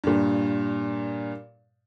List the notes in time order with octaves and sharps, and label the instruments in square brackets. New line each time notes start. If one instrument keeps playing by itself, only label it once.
[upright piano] G2 A#2